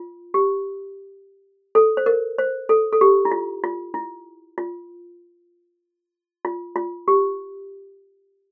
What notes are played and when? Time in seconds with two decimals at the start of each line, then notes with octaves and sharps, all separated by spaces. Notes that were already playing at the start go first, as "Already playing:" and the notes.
Already playing: F4
0.34 G4
1.75 A4
1.97 C5
2.06 A#4
2.39 C5
2.69 A4
2.92 A4
3.01 G4
3.25 E4
3.31 F4
3.64 F4
3.94 E4
4.58 F4
6.45 F4
6.76 F4
7.08 G4